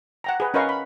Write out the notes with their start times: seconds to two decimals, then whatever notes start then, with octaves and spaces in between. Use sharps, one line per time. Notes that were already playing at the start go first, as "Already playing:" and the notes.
0.24 F#5 G5 A#5
0.40 G#4 B4
0.54 C#4 A#4 B4 D#5 F5 C#6
0.69 B5